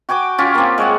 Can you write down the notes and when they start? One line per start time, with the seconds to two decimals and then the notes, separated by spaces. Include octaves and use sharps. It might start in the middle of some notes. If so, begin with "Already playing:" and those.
0.09 F#4 G5 G#5 D6
0.38 C#4 F4 G4
0.55 A#3 C4
0.78 G#3 C#5 F#5